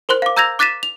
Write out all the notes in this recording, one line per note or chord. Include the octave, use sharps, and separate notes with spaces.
A#4 C5 C6 F#6
F5 D6
A#5 E6 G6 G#6 A#6 F7
D6 F#6 A6 B6 D#7 E7
F7